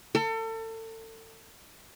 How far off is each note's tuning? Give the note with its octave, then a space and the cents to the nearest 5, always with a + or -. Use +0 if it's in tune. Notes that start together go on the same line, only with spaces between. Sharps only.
A4 +35